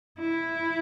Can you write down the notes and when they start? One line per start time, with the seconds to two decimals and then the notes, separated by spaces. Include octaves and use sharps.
0.20 E4